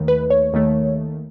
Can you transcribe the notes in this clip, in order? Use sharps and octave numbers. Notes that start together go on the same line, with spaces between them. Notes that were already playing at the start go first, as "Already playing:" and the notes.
Already playing: D#2 D#3 A3
B4
C#5
D#2 D#3 A3